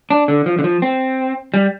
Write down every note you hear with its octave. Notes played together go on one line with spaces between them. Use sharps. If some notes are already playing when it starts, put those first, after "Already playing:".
D4
D3
F3
D3
F3
C4
G3